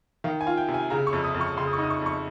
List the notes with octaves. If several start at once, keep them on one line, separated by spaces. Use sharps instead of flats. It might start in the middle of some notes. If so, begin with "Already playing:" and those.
D#3 F5
G#5
F4
G5
C3
G#5
C#3 A#5
C#6
F2
D#6
F2
C#6
C#3 C6
D#6
C#6
D#4
D#6
C#6
F2 C#6